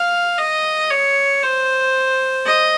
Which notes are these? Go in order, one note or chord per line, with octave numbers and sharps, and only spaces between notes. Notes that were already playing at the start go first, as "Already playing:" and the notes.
Already playing: F5
D#5
C#5
C5
D#5